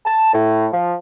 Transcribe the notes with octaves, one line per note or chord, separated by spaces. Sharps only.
A5
A2
F3